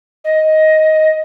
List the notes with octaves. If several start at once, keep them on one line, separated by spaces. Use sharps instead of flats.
D#5